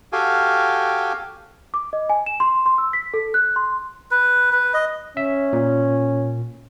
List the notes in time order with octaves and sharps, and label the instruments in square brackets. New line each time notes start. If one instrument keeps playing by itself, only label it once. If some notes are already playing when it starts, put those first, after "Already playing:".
[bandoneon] F#4 G4 A4 F5 G5 G#5
[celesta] D6
D#5
G#5
E7
C6
C6
E6
B6
A4
F#6
C6
[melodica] B4
B4
D#5
[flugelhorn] C#4 [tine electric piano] E5
[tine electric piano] A#2